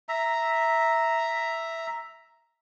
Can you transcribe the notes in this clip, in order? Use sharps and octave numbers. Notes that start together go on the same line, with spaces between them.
E5 A#5